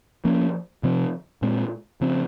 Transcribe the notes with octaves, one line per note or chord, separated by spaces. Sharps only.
F3 A#3 C#4
C3 F3 C4
A#2 G#3 C4
C#3 F3 C4